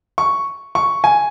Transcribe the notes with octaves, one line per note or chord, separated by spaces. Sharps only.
C#6
C#6
G#5